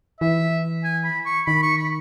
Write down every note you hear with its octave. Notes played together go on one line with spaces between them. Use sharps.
E3 E5
G#5
B5
C#6
D#3 B5
C#6
B5